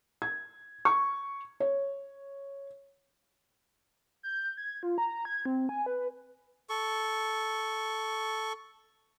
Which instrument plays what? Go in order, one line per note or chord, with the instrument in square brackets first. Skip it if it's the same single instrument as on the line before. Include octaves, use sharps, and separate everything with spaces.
[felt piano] G#6
C#6
C#5
[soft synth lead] G6
G#6
F4
A#5
G#6
C4
G#5
B4
[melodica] A4 C#6